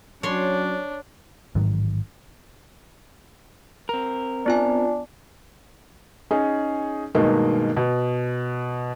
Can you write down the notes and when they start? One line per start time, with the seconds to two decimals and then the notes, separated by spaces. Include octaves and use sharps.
0.23 F#3 C#4 D4 C#5 C6
1.55 A1 G#2 D#3 F#3
3.89 C4 A#4
4.46 B3 D4 F4 G#5
6.31 C#4 D#4 G#4
7.15 G2 B2 D#3 G#3 A#3 D#4
7.77 B2